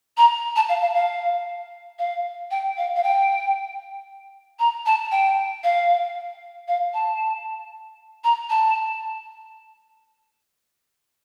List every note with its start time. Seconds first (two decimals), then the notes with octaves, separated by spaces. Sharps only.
0.17 A#5
0.56 A5
0.69 F5
0.82 F5
0.95 F5
1.99 F5
2.51 G5
2.77 F5
2.96 F5
3.03 G5
4.59 A#5
4.86 A5
5.12 G5
5.64 F5
6.68 F5
6.94 A5
8.24 A#5
8.50 A5